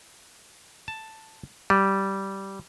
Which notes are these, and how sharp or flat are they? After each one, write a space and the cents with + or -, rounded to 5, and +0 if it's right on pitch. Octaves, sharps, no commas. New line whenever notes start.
A5 +5
G3 -10